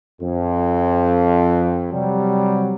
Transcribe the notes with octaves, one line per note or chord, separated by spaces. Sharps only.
F2
C3 F#3 G3